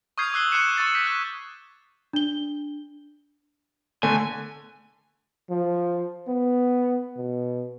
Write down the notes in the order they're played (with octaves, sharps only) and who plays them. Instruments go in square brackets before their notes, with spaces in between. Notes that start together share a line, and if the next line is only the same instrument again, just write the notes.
[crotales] C#6 D#6 F6 G6 G#6 C7
D6 E6 F#6 C7 G7
C#6 F#6 G#6 C7 C#7 E7
C#6 E6 A6 C7
G6 B6
F#6
[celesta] D4 G7
[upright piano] D3 A3 [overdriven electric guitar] G#5
[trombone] F3
B3
B2